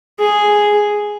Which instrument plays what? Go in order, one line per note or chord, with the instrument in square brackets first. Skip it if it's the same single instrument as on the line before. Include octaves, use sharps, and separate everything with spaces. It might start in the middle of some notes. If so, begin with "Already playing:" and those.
[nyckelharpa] G#4